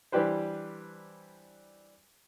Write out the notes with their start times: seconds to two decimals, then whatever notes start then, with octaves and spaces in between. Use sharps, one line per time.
0.12 E3 G3 D4 G4 B4 C5